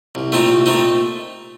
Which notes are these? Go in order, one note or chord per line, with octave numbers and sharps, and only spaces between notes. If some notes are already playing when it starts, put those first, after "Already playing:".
C2
A#2 A3 C4 D#4
C2
A#2 A3 C4 D#4